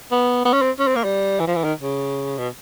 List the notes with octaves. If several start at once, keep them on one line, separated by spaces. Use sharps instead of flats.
B3
B3
C#4
C4
C#4
C4
A#3
G3
E3
F3
E3
D#3
C#3
B2